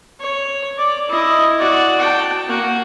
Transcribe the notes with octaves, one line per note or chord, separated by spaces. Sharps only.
C#5
D5 D6
E4 D#5
F#4 D5
G5 A5
A#3 F#4